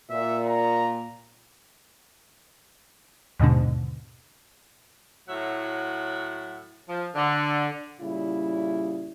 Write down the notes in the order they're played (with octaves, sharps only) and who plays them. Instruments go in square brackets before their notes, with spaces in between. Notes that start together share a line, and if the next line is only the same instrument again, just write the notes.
[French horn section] A#2 [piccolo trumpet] E5
[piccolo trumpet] A#5
[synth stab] D#2 G#2 B2 D3
[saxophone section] A2 F#3 E5 F#5
F3
D3
[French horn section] A#2 C#3 G3 E4